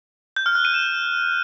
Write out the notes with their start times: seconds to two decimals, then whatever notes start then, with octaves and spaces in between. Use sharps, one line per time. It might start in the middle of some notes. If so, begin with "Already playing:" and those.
0.36 G6
0.46 F6
0.55 F#6
0.65 D#7
0.74 E7